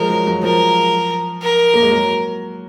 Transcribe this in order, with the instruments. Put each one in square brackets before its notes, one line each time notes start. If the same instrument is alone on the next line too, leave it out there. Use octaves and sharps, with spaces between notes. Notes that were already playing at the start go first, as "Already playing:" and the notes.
Already playing: [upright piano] F3 G#3 [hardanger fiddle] A#4
[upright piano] F#3
F#3
[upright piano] F3 [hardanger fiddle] A#4
[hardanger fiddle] A#4
[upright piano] A#3
G#3
F#3